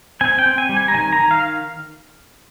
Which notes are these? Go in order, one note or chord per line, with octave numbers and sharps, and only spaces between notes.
C4 G#5
G5
C4
G#5
G3
G#5
A#5
D#3 G#5
A#5
D#3
F5